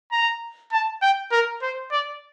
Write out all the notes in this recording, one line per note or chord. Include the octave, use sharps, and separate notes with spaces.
A#5
A5
G5
A#4
C5
D5